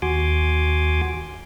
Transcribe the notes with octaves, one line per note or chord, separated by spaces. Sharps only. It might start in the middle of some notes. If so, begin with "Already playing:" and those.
D#2 F#4 G#5 C6 D6